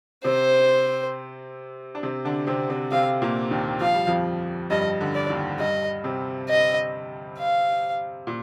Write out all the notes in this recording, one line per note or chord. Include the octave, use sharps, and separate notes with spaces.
C3 C4 C5
D4
C3 C4
D3 D4
C3 C4
C3 C4
C3 C4 F5
A#2 A#3
D#2 D#3
F3 F5
G3
F2 F3
G2 G3 D#5
D3
D5
D#2 D#3
G2 G3 D#5
C3 C4
D#5
F5
A#2